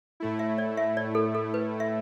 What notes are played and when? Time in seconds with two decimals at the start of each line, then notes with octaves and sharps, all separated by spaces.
0.20 A2 A3 E4
0.39 E5
0.58 D5
0.77 E5
0.97 D5
1.15 A4
1.35 A4
1.54 B4
1.80 E5